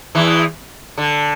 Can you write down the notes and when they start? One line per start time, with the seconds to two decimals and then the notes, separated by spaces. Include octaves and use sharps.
0.15 E2 E3
0.98 D3